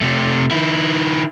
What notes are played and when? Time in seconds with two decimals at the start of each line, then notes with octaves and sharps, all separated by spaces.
0.01 C3 A3
0.51 D#3 E4